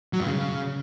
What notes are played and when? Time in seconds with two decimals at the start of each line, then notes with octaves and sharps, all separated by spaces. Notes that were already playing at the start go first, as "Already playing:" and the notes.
0.13 F#3
0.20 G2
0.27 C#3